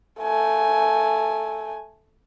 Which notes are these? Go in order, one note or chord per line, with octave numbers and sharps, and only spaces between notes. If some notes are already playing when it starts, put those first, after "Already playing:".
A3 G#5